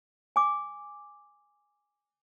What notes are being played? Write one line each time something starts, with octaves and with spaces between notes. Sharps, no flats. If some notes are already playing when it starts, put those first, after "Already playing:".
G#5 D6